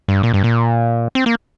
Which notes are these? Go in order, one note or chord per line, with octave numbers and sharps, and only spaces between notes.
G2
A#2
G2
A#2
C4
A#3